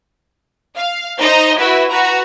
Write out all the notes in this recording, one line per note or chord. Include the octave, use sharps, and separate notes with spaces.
F5
D#4 C5 D#5 A#5
E4 F#4 B4 E5
F#4 B4 A#5